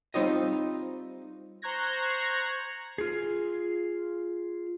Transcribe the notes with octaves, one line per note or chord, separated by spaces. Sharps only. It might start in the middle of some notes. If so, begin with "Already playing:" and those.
G3 C4 D#4 F4 C#5 D#5
C5 A#5 C#6 F#6 G#6 A#6
F4 G#4